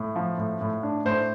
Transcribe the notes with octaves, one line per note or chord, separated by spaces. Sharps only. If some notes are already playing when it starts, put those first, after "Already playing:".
Already playing: A2
F3
A2
A2
D4
A2 C5